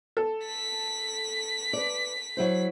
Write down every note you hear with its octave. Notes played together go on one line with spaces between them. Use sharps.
A4
B6
B4 D5
F#3 E4 C5